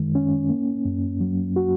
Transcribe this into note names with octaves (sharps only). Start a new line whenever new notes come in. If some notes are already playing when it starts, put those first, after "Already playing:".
Already playing: F#2 D#3 G#3
C#4
A#3
F#2
F#3
F#4